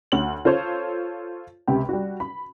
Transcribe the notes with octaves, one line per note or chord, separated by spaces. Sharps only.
D2 C#5 F#7
F4 A4 C5 C#5
C#2 C3 G4
G3 F#4
B5